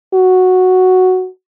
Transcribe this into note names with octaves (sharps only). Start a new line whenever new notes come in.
F#4